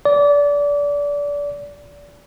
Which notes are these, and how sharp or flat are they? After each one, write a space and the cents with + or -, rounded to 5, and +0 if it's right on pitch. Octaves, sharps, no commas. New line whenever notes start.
D5 -25